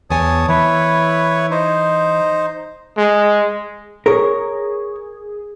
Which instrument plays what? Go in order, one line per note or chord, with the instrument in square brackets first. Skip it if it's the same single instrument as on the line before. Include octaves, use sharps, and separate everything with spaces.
[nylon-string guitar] E2 G#5 [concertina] C#5 A5 D#6
[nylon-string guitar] E3 [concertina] E4 B4 C#5
[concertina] D#4 C5
[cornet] G#3
[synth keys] G#4 [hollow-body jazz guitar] A#4 C#5